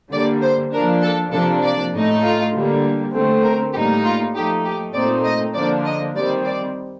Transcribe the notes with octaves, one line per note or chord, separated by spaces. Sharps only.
D3 G3 A#3 D5
C5
F3 A#3 D4 A#4
A4
C3 F3 A#3 D4 A4
D5
A2 A3 D#4
F4
D3 G3 A#3
D3 A3 C4
A#4
A2 G3 A#3 D#4 G4
F4
F3 A3 D#4 G4
G4
A#2 A3 C4 D#4 D5
D#5
D3 F3 A#3 D4 D5
D#5
D#3 G3 C4 D5
D5